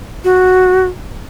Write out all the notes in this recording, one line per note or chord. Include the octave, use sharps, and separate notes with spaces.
F#4